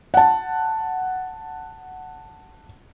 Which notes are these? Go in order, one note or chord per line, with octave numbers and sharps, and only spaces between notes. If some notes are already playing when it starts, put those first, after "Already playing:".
F#5 A5